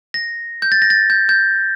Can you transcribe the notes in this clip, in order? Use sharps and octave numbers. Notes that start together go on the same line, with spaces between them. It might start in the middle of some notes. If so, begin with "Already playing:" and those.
A#6
G6
A6
A#6
A6
G6
G6